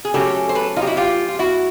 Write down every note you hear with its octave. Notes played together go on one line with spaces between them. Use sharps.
G#4
C#3 F#3 A3 C#4 G4 A4
C5
A4 B4
D#4 F4
G4
E4 F#4
F4 G4
F4
E4 F#4